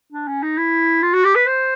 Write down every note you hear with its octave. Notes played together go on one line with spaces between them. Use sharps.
D4
C#4
D#4
E4
F4
F#4
G4
B4
C5